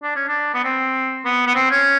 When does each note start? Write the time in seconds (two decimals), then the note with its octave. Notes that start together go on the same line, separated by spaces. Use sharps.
0.03 D4
0.16 C#4
0.28 D4
0.54 B3
0.64 C4
1.25 B3
1.47 B3
1.55 C4
1.71 C#4